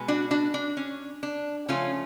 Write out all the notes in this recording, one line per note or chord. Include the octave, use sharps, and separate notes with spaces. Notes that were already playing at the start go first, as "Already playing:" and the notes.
Already playing: B2 G#3 B3
D4 F#4
D4 F#4
D4
C#4
D4
C#3 F3 A3 C#4 F4